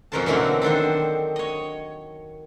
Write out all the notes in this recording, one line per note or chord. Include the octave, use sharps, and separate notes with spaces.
F2 B2 C#4 A#4 C5 A5
B2 D3 E3 F#3 A#3 C4
D#3 D4 A4 C5
C#5 D#5